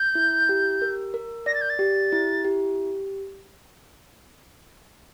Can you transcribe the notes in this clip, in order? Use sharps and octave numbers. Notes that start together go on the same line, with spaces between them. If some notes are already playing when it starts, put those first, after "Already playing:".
Already playing: G6
E4
G4
A#4
A#4
D5 A#6
A6
G6
A6
G4
E4
G4